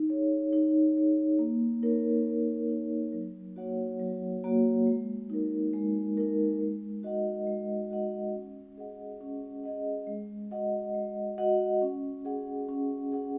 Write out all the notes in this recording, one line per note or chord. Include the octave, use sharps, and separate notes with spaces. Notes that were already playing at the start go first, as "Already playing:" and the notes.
Already playing: D#4
G#4 C#5
D#4
G#4 C#5
A#3
D#4 A#4 C#5
A#3
D#4 A#4 C#5
F#3
A#3 F#4 C#5 F#5
F#3
A#3 F#4 C#5 F#5
G#3
D#4 A#4
G#3
D#4 A#4
G#3
F#4 D#5 F#5
G#3
F#4 D#5 F#5
C#4
G#4 D#5 F#5
C#4
G#4 D#5 F#5
G#3
F#4 D#5 F#5
G#3
F#4 D#5 F#5
C#4
G#4 F#5
C#4
G#4 F#5